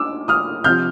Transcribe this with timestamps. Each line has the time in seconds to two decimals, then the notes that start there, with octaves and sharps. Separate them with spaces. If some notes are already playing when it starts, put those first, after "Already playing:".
Already playing: D6 E6
0.28 D#6 F6
0.64 C3 F3 F6 G6